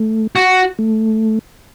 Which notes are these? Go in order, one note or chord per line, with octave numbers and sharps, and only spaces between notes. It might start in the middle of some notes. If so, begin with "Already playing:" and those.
Already playing: A3
F#4
A3